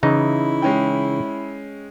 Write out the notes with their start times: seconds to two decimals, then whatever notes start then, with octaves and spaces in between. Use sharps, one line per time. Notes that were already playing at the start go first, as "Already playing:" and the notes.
0.03 C#3 E3 D#4 E4
0.62 G#3 C#4 G5